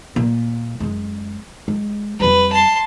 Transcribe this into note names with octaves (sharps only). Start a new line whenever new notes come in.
A#2
F#2 G#3
G#3
F2 G3 B4
A5 C6